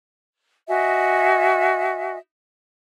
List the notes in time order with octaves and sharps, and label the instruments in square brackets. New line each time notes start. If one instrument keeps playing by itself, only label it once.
[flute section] F#4 D#5 E5 G#5